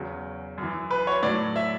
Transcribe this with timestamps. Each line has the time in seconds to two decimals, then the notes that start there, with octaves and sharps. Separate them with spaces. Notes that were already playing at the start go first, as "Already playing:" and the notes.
Already playing: E2 C#3 F#3
0.58 F#2
0.63 E3
0.91 B4
1.07 C#5
1.23 A2 F#3 D5
1.56 E5